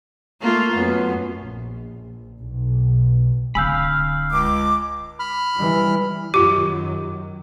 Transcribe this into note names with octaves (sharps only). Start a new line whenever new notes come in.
A3 A#3 F4
F#2 B3
A#1
B1
D1 D3 F5 G#5 B5 E6 G6
C#2 D6
B5 F6
E3 G3
F#2 D#3 F#3 F4 G4 D6